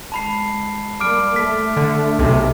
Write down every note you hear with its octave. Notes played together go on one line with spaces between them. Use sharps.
G#3 A5 B5 C7
G3 A#3 D6 F6 D7
A3 B6
D3
B1 C3